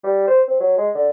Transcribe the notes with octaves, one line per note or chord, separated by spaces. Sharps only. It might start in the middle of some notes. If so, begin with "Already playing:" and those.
G3
C5
C4
F#3
G#3
D3